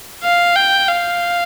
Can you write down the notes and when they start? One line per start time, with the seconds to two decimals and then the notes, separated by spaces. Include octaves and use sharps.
0.24 F5
0.56 G5
0.88 F5